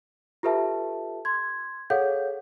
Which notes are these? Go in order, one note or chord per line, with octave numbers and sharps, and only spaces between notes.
F4 G4 A4 B4 E5 A5
C6 G#6
G#4 A4 C#5 F5 F#5 G6